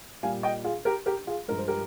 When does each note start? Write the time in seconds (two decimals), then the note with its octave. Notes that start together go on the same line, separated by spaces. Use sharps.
0.23 A#2 G3 F5 G#5
0.43 D#5 G5
0.64 F4 G#4
0.85 G4 A#4
1.06 G4 A#4
1.27 F4 G#4
1.48 G2 F3 G#3 A#4
1.58 C5
1.68 G4 A#4